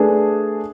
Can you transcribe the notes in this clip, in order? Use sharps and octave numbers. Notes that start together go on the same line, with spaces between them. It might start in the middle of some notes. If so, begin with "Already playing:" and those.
Already playing: A3 D4 G#4 B4